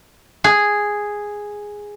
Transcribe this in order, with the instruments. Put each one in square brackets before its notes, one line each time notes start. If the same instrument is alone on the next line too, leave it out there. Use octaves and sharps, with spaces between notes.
[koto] G#4